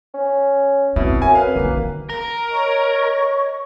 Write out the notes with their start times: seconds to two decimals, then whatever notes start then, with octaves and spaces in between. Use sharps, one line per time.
0.14 C#4
0.96 B2 C4 E4
1.22 F#2 G#5
1.35 B4 F5
1.56 D3 D#3 A#3
2.10 A#4
2.50 C#5 D#5 C#6